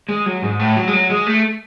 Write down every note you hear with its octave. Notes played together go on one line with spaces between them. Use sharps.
G#3
F#3
G#2
A2
F#3
G#3
F#3
G#3
A3